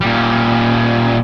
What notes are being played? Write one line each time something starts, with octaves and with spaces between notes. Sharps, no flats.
A#2 G3